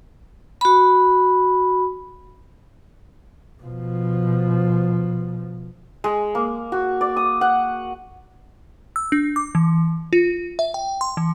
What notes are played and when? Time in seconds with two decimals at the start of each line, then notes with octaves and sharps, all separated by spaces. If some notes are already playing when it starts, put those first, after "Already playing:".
0.61 F#4 B5
3.63 B2 F3
6.04 G#3
6.35 A#3
6.72 F#4
7.01 D5
7.17 D#6
7.41 F#5
8.96 E6
9.12 D4
9.36 D6
9.55 E3
10.13 F4
10.59 E5
10.74 G5
11.01 C6
11.17 E3